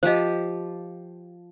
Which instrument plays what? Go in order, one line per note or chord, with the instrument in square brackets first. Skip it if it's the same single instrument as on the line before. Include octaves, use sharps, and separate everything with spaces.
[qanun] F3 G4 [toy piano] C5 D#5